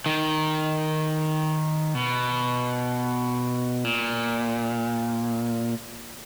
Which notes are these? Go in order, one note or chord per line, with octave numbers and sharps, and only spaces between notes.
D#3
B2
A#2